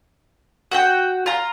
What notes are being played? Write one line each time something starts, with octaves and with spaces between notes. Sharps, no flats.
F#4 F#5 G5
F4 A#5